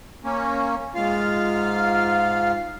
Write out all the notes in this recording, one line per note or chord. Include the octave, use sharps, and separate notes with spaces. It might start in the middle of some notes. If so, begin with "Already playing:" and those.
A#3 C#4
G#2 F4 F5